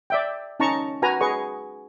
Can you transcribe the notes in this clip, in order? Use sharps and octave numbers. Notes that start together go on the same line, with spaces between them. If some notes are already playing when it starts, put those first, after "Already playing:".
D5 E5 G5
C#4 D#4 A5 A#5 C#6
F#4 B4 G#5 A#5
G#4 B4 D#5 C#6